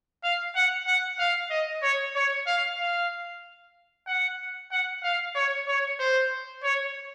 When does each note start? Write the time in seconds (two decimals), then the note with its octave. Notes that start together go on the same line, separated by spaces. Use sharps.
0.23 F5
0.56 F#5
0.87 F#5
1.19 F5
1.51 D#5
1.82 C#5
2.15 C#5
2.47 F5
2.78 F5
4.07 F#5
4.71 F#5
5.03 F5
5.35 C#5
5.67 C#5
5.99 C5
6.63 C#5